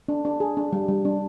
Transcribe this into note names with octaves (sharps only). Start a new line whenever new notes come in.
D4
D4
G#4
D4
G3
G3
D4